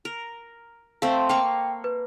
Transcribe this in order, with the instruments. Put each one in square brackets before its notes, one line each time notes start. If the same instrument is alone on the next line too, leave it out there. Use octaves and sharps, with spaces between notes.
[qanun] A#4
[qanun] A3 C4 [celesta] F5
[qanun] A#3 F5 C#6 [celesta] G5
[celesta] B4